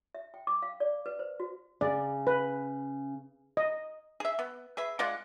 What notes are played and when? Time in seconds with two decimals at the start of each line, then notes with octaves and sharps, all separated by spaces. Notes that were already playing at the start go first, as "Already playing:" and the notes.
0.15 E5
0.34 G5
0.47 D6
0.62 F5
0.80 D5
1.06 B4
1.19 C5
1.40 F#4
1.81 C#3 D5
2.27 B4
3.57 D#5
4.20 G#4 E5
4.39 B3
4.77 G#4 B4 E5
4.99 G#3 F4 D5 F#5